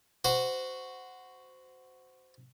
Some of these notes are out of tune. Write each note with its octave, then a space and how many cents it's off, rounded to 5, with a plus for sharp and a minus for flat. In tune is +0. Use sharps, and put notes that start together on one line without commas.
F#4 +0 C5 -20